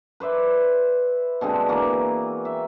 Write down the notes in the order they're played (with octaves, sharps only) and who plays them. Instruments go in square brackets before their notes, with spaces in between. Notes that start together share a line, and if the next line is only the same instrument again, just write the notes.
[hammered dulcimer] B4 C5 D5 E5
B2 D3 G#3 C4
E3 A#3 F#4
E5